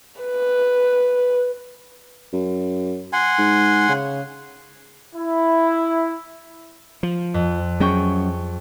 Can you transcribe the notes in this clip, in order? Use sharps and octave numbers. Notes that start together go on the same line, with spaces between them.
B4
F#2
F#5 G#5 C6
G#2
C#3
E4
F3
F2
F#3 C#4 G#4 G5 C#6